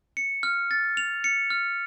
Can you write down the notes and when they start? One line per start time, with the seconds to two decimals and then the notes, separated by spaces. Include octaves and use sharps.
0.17 C#7
0.43 F6
0.71 A6
0.97 F7
1.24 C#7
1.50 F6